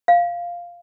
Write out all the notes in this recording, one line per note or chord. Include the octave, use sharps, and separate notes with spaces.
F5